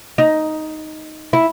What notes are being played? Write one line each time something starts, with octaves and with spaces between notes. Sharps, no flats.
D#4
E4